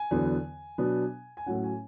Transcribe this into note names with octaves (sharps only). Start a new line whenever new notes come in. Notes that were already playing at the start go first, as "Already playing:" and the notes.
Already playing: G#5
E2 D3 F#3 B3
B2 F#3 B3 D4
G#5
A2 F#3 C#4 F#5
G#5